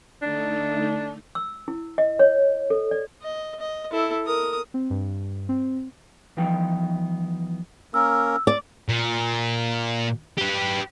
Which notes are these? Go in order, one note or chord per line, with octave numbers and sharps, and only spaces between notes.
D3 A3 D4 D#4
E6
E4
D#5
C#5
A4
D5
D#5
D#5
E4 A4
A#4 D#6
C4
G2
C4
E3 F3 G3 B3 D#4 G5
A#3 C#4 A#4 E6
D5
A#2
G4 B4